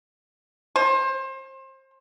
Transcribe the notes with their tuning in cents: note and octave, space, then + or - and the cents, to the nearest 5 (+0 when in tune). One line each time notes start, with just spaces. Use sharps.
C5 +30